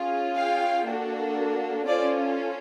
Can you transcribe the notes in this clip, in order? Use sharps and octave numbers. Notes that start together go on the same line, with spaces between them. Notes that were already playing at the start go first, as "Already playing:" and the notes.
Already playing: C#4 F4 G#4
F5 G5
A#3 D4 F#4 A4
C#4 F4 A4 C5 D5